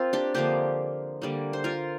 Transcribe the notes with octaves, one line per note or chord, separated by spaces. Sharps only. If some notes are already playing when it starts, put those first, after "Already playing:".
Already playing: A#3 C4 F4 A#4
D4 G4
D3 F3 A#3 G4 C5
D3 G3 A#3
C5
F4 A#4